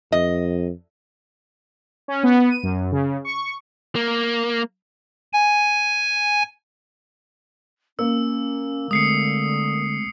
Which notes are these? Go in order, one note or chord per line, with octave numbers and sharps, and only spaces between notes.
F2 D#5
C#4
B3
D#7
F#2
C#3
C#6
A#3
G#5
A#3 C#4 E6
D3 G#3 A3 C4 D#6 C7 C#7